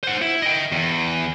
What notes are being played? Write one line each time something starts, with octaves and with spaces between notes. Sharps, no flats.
C5 F#5
E4
D#5 G5
E2